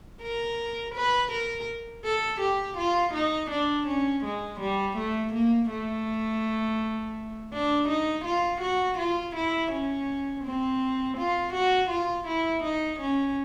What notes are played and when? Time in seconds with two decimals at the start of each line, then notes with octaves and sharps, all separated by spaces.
0.21 A#4
0.95 B4
1.31 A#4
2.04 A4
2.40 G4
2.77 F4
3.14 D#4
3.50 D4
3.87 C#4
4.24 G#3
4.60 G3
4.97 A3
5.33 A#3
5.70 A3
7.53 D4
7.88 D#4
8.25 F4
8.61 F#4
8.98 F4
9.35 E4
9.71 C#4
10.44 C4
11.18 F4
11.53 F#4
11.90 F4
12.27 E4
12.63 D#4
13.00 C#4